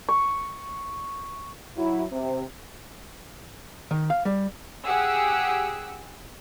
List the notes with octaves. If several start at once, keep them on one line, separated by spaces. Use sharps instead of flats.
C#6
F#3 E4
C3
D#3
F5
G3
G4 G#4 F#5 E6